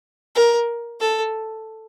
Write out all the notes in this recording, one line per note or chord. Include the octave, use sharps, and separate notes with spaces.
A#4
A4